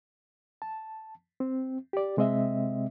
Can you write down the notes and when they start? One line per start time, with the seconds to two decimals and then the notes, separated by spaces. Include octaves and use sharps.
0.62 A5
1.40 C4
1.93 G4 D5
2.17 C3 G#3 C4 D#5 E5